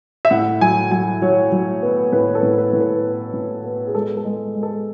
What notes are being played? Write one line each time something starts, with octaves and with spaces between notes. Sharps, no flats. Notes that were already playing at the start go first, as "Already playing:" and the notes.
E5
A2 F#5
F#3 G#5
F#3 G#5
F#3 C#5
F#3
B3
A2 B4
A4
A2
B4
A2
B4
B3
A2
B3
G#4
G#3 A4
A4
G#3
G#3
A4